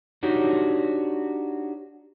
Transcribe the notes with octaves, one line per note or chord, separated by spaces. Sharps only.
D4 D#4 F#4 G4 C#5